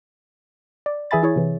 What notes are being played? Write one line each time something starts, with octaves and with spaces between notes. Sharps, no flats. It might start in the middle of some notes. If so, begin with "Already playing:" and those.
D5
E3 G#4 E5 G#5 B5 A6
E4 G#4 C#5
C3 E3